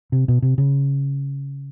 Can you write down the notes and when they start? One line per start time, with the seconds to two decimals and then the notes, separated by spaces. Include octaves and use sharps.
0.12 C3
0.28 B2
0.42 C3
0.58 C#3